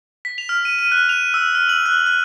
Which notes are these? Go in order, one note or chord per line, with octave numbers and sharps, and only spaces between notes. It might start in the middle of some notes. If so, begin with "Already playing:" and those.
B6
F7
F6
D#7
D#7
F#6
F7
E6
F6
F#7
F#6
F#6